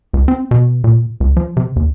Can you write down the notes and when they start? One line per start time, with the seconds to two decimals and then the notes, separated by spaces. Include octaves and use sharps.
0.13 C#2
0.28 C4
0.51 B2
0.84 A#2
1.20 C#2
1.37 F3
1.57 C3
1.76 D#2